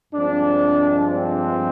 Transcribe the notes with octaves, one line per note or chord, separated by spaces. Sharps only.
G2 F3 G#3 C4 D4
C4